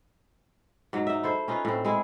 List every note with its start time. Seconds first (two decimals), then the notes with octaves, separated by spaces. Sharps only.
0.93 G#2 F#3
1.07 D#4 E5
1.23 E4 A4 C5
1.48 C#4 D#4 F4 B4
1.65 A2 C4
1.85 G#3 E4 G#4